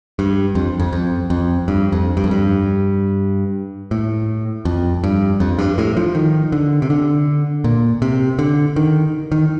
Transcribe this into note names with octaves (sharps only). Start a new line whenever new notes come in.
G2
F2
F2
F2
F2
G2
F2
G2
F2
G2
A2
F2
G2
F2
G2
A2
F3
D#3
D3
C3
D3
A#2
C3
D3
D#3
D#3